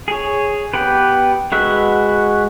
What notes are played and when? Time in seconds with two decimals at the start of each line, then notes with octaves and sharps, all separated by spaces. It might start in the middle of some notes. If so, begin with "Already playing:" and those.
0.08 G#4 C#5
0.73 B3 G4 B4
1.52 G#3 F#4 B4 E5